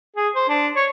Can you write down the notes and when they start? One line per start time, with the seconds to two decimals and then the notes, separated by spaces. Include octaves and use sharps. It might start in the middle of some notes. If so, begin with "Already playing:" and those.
0.16 G#4
0.35 C5
0.49 D4
0.76 C#5